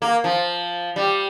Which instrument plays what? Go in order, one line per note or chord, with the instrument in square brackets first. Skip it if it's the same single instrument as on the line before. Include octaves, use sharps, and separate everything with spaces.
[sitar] A#3
F3
G3